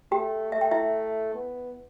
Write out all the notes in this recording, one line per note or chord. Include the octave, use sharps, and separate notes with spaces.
A3 G4 G5
A3 E5
G5
E4 E5
B3